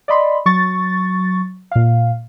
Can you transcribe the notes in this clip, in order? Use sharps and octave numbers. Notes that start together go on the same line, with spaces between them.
D5 D#5 B5 C6
F#3 C#6 A6
A#2 F5